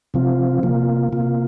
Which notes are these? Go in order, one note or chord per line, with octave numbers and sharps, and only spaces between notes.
C3 F3 C4 F4
C3 A#3 F4
C3 A#3 F4